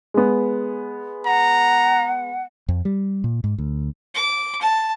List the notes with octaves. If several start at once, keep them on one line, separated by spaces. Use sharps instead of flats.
G#3 B3
F#5 A#5
F2
G3
A#2
G#2
D2
D6
A5